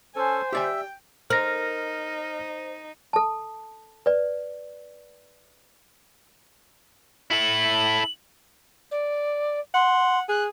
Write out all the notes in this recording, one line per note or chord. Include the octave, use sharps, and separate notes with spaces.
C#4 A4 C5 G#5
G4 D5 E5 G5 G#5
D#4 A#4 C5 F6 A#6
A4 A5
B4 D5
E4 A4 F#7
D5
F#5 C6
G#4 F#6